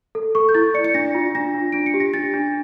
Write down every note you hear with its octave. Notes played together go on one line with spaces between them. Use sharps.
A4
A4 C#6
G6
E4 A6
D5 C#7
C#7
D4 A#6
F4
D4 A#6
F4
D4 D7
C#7
G4
A#6
D4 A6
D4